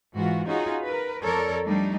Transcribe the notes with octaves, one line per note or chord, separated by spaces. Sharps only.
G#2 E3 F4 F#4
C#4 D#4 F4 F#4 G#4
A#4 B4
F2 A4 A#4 C#5 D5
F3 G3 A3 D4 D#4